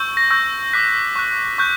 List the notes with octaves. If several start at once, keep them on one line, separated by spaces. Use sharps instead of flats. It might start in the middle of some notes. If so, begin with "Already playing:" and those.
Already playing: C#6 E6 G6
A#6
C#6 E6 G6 A#6
D6 F#6 B6
C#6 F#6
C#6 F#6 G6